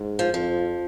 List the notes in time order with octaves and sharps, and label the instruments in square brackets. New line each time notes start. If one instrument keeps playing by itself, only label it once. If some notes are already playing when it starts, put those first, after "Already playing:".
Already playing: [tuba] G#2
[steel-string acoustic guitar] F3
[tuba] F2 [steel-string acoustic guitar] F3